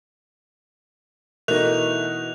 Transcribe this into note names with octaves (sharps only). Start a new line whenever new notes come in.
B2 E3 A3 D#4 A#4 F#6 F7